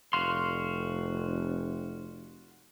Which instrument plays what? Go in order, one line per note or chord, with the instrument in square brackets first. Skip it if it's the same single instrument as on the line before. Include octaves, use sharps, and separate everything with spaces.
[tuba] F1 [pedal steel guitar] F#4 F5 C6